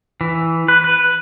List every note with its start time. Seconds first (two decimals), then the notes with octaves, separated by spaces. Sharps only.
0.21 E3
0.68 B4
0.84 B4